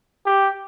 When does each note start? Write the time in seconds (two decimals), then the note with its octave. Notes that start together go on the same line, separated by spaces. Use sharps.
0.26 G4